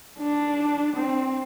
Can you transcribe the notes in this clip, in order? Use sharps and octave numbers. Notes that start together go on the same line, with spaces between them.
D4
C4